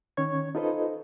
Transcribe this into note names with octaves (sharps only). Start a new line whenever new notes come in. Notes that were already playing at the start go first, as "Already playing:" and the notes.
D#3 C#4 C#5 C#6 G#6
D#4 F4 A4 B4 C5 D#5